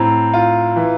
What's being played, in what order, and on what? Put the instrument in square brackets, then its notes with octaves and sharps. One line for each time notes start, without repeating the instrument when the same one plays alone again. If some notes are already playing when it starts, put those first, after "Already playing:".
Already playing: [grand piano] A2 C4 [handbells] A#5
[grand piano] F4
E3